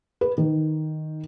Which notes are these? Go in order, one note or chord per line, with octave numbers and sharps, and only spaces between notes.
B4
D#3